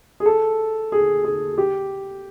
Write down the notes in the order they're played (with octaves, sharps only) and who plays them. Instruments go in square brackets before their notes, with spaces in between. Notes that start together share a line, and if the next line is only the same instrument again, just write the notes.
[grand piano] G#4
A4
G#4
G#4
G4